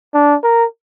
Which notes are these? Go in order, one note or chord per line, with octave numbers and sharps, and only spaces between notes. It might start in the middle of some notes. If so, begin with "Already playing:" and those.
D4
A#4